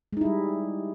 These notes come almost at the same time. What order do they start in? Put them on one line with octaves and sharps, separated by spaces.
G#3 D#4 E4 G3